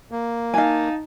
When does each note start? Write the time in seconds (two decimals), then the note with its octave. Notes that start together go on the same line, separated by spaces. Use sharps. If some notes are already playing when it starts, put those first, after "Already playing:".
0.12 A#3
0.54 D#4 F5 G#5 A5